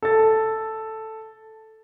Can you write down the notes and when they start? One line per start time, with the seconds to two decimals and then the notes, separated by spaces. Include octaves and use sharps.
0.02 A4 A6